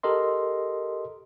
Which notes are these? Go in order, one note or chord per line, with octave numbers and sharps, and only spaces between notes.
G4 A4 A#4 D#5 C6